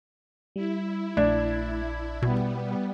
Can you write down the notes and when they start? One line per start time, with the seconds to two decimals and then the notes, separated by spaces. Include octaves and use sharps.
0.56 G3 E4
1.17 A#1 A3 D4 G#6
2.22 B2 G3 B3